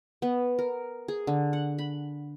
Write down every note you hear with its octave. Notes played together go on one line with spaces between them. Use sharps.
B3
A#4
G#4
D3
F#5
B5